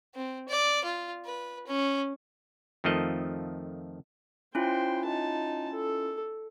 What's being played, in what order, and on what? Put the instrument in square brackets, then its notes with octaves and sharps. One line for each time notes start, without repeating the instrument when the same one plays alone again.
[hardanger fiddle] C4
D5
F4
B4
C#4
[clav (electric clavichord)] F2 D#3 F3 A3 D#5
[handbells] C#4 E4 F4 [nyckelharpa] C5 G5
[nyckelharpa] D#4 A5
A4